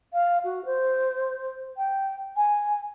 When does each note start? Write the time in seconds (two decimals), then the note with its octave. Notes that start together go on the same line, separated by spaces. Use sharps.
0.13 F5
0.44 F#4
0.65 C5
1.77 G5
2.37 G#5